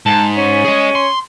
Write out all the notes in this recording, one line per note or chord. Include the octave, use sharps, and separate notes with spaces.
G#2 A5
C#4
G#4 D#5
C6